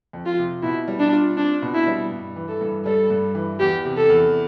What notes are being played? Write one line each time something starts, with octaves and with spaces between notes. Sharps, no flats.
F2
F4
C3
B2 E4
G3
D4
F4
C4 D4
B2
E4
G3
G2
E3
A4
G2
G3 A4
G2
E3
E2 G4
C3
A4
E2